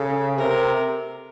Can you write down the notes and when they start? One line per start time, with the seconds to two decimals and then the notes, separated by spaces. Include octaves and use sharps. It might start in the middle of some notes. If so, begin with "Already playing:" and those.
Already playing: C#3 A4
0.38 C3 A#4